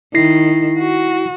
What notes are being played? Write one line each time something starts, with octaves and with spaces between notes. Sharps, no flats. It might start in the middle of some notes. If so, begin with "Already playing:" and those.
D#3 E4 A#6 C7
F#4